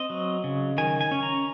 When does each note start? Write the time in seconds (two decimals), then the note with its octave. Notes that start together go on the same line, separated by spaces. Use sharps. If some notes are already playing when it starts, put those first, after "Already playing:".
Already playing: C4 D#5
0.10 F#3
0.44 C#3
0.78 D#3 G#5
1.01 G#5
1.11 C#4
1.23 A#5